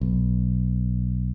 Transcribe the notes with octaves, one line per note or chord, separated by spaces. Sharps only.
B1